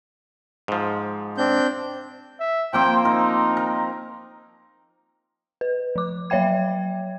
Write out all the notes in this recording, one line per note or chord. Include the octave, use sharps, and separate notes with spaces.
G#2 F3
C4 D4 G6
E5
F3 A#3 C4 G5
D#4 A#4
A#4
B4
F3 D6
F#3 C#5 E5 G5 G#6